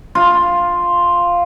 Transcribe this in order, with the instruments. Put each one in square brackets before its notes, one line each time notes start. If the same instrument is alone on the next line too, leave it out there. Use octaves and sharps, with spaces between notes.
[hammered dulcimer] F4